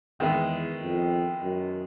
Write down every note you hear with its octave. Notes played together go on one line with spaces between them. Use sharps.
E2 D#3 G#3 B3 E4
F2
F#2